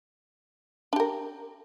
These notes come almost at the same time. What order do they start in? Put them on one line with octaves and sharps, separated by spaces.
D4 G4 A#4